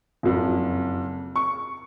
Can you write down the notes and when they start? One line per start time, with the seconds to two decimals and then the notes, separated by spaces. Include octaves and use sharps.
0.23 F#1 F2
1.36 C#6